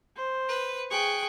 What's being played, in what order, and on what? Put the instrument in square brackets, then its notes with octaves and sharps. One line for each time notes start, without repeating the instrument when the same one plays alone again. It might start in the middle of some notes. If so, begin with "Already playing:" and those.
[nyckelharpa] C5
[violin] B4
[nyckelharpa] G#4 C#6 [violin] G5 F#6